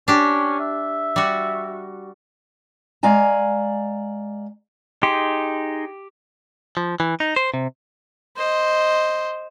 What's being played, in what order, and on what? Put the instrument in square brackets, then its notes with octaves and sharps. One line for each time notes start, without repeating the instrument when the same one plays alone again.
[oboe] C#4 [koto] D4 G4
[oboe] E5
[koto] G3 F#4
[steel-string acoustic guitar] G#3 D5 F5 G#5 A#5
[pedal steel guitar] D#4 G#4 C6 [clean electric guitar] G4
[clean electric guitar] F3
E3
D#4
C5
C3
[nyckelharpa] C5 D#5